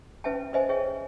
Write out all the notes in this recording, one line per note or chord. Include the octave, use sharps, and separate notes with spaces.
C#4 B4 E5 G5 A5
B4 C5 D#5 E5 G#5
G#4 C#5 E5 G5